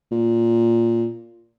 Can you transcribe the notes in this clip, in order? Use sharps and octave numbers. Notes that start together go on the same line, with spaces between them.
A#2